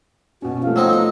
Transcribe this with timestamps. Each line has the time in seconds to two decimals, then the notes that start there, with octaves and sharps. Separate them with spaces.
0.42 B2 C#4 F#4
0.63 F3 A3 F5
0.76 F#3 C4 D#4
0.93 B3 D#4